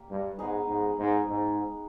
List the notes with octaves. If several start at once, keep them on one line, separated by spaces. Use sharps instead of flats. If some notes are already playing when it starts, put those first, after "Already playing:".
Already playing: G3 A#3
G2
G#2 B3 D#4 G#4
G#2
G#2
G#2